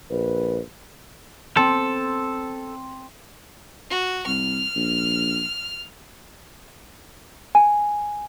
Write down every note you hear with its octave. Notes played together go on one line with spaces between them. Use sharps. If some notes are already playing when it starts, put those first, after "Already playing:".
A#1 B4
C4 A4
F#4
C2 F6
A#1
G#5